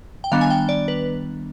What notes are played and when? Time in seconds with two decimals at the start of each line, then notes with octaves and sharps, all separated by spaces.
0.24 G5
0.32 D#3 G3 B3 D4 F5
0.41 G#5
0.50 G5
0.69 D5
0.88 B4